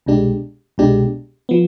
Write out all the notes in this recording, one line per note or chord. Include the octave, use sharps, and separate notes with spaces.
C2 B2 G#3 D4 G4
C2 B2 G#3 D4 G4
F3 B3